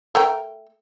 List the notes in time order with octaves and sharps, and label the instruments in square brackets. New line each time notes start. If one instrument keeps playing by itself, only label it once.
[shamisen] A3 A#4 G5